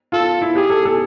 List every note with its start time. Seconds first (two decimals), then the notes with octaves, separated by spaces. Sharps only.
0.12 F4 A4
0.42 E4
0.56 G4 G#4
0.70 A4
0.85 A4